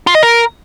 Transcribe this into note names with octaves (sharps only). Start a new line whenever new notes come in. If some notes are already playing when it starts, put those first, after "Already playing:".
F4
D#5
A#4